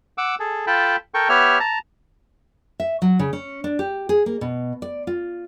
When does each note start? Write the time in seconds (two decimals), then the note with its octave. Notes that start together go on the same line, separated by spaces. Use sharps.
0.18 F#5 D6 E6
0.40 G#4 A4
0.67 F4 A4 G5 A5 B5
1.14 A4 A#4 G5 C#6
1.29 B3 G4 C#5 E5 F6
1.60 A5 A#5
2.80 E5
3.02 F#3
3.19 C#3
3.33 C#4
3.64 D4
3.79 G4
4.09 G#4
4.26 A#3
4.41 B2
4.82 D5
5.07 F4